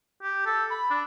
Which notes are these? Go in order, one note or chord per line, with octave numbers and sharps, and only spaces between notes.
G4
A4
B5
D4